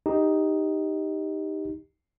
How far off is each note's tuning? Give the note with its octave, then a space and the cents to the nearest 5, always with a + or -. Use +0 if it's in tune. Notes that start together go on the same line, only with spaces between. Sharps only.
D#4 +5 G4 +0